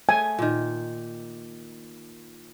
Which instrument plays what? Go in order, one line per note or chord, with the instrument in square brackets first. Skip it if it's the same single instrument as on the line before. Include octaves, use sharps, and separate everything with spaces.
[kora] A3 [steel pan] G#5
[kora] A#2 D#3